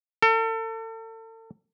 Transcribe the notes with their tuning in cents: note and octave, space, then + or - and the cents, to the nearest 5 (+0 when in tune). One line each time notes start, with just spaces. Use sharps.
A4 +35